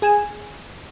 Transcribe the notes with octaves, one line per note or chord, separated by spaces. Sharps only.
G#4 G#5 E7